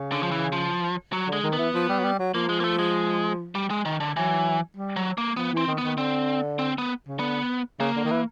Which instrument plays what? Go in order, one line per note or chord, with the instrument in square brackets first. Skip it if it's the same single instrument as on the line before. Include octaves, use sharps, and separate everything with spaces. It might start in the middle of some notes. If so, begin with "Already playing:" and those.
Already playing: [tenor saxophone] C#3
[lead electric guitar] D3
F3
E3
F3
F#3
[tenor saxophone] D3
[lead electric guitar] G#3
[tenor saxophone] D#3
[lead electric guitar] B3
[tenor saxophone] E3
F3
G3
F#3
G3
F#3
[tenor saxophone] F3 [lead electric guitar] A#3
[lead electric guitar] G#3
A#3
A3
G#3
G3
G#3
D#3
D3
[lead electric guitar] E3 [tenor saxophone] F#3
[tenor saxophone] G3
[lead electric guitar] F#3
A#3
[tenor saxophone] F3 [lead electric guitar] B3
[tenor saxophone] E3 [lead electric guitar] C4
[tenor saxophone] D#3
[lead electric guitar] B3
[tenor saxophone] D#3
[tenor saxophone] D3 [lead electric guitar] C4
[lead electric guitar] C4
B3
[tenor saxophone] C#3
[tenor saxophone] D3 [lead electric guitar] B3
[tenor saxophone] C#3 [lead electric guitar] A#3
[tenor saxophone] D3
D#3
E3